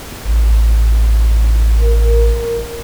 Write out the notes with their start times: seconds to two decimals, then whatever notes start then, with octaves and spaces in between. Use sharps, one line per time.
0.25 A1
1.81 A#4